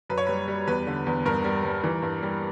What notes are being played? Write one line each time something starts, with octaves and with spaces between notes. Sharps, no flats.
F#2 B4
C#5
G3 B4
G3
E2 B4
D3
E2
G2 A#4
G3
G3
E3
G2
G3